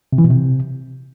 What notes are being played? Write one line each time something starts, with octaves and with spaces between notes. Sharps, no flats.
C3
E3
B2
C3